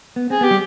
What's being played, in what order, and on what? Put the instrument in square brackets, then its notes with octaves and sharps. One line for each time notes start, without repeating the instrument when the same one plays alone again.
[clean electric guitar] B3
[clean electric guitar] C4 [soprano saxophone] G#4
[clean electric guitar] B3 [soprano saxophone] G4
[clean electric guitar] G3